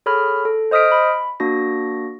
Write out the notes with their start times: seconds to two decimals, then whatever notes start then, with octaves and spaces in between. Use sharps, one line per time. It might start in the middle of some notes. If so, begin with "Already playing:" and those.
0.06 G#4 A4 C#5 B5 F6
0.45 A4
0.71 C5 D#5 D#6 F6 B6 D7
0.92 B5
1.40 A#3 D4 F#4 A#6